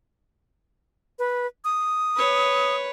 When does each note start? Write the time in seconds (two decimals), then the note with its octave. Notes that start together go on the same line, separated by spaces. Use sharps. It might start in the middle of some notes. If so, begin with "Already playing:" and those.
1.19 B4
1.65 D#6
2.17 B4 C#5